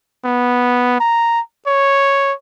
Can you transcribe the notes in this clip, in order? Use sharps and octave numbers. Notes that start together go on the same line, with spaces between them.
B3
A#5
C#5